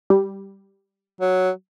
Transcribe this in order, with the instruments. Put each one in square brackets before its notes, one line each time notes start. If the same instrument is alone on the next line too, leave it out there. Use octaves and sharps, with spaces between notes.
[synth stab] G3
[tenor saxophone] F#3